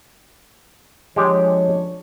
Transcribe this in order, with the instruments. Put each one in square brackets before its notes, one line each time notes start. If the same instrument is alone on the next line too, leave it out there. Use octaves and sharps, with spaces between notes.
[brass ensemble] F3 D4 C#5 [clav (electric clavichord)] G#3 G4